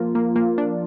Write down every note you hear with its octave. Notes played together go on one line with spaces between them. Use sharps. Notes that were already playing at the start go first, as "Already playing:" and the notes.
Already playing: F3 A#3 F4
A#3
A#3
D4